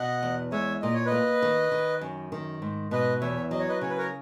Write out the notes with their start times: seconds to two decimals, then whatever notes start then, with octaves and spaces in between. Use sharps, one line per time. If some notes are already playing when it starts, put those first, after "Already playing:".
Already playing: B2 D#5 F#5
0.23 E2
0.52 G#3 C#5 E5
0.82 A#2 D#5
0.94 C#5
1.06 B4 D#5
1.12 A#3
1.42 D#3
1.72 D#3
2.01 F#2
2.32 D#3
2.62 G#2
2.91 B2 B4 D#5
3.21 E2 C#5 E5
3.51 F#3 D#5
3.60 C#5
3.69 B4 D#5
3.81 C#3 C#5
3.90 B4
3.98 A#4 C#5